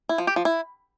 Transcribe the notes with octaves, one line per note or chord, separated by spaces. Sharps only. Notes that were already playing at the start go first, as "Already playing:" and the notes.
E4
F3
G4
F3
E4